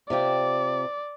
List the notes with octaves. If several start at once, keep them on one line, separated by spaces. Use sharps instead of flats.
C3 F4 G4 D5